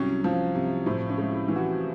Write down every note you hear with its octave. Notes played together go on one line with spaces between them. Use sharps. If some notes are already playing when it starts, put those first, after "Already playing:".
Already playing: C2 F#3 C#4
F3
C3
A2 C4
C#4
G#3
E4
E3
F#4